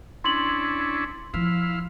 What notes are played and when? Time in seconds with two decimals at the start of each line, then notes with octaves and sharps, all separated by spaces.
0.24 C#4 D4 E4 C6 F#7
1.34 F3 E4 F5